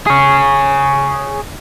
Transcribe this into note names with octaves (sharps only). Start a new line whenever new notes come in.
G#4 C#5